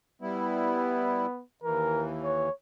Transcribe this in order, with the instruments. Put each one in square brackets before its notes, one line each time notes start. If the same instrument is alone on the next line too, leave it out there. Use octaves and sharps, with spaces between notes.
[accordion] G3 E4 [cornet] B3
[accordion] D#2 E3 [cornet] A#4
[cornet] C#5